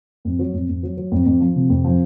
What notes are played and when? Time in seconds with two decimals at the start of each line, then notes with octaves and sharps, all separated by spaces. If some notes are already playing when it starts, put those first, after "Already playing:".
0.25 F2
0.39 F#3
0.53 F2
0.68 F2
0.83 F#3
0.97 F#3
1.12 F2
1.26 F2
1.41 F3
1.55 C3
1.70 F2
1.84 F3